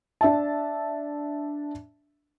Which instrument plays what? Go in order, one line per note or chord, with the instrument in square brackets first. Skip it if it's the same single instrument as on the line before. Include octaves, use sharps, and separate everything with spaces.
[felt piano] D4 E5 A5